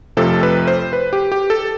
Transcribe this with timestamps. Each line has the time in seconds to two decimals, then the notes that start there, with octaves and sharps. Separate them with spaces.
0.17 F2 C3 F3 A3 A4
0.43 B4
0.67 C5
0.93 B4
1.13 G4
1.32 G4
1.50 A4